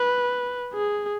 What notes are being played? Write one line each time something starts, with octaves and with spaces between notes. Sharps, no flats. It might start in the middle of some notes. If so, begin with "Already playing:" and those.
Already playing: B4
G#4